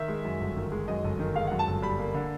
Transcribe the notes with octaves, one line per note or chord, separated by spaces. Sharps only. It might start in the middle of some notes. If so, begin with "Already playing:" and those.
Already playing: D#3 E5
G#3
F#2
G1
D#3
G#3
F#2 D#5
G1
D#3
G#3 F5
F#5
F#2
A5
G1
G3 B5
A#3
D3